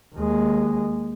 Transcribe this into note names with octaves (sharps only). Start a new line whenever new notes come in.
D#2 G#3